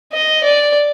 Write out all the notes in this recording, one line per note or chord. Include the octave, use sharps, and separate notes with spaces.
D#5
D5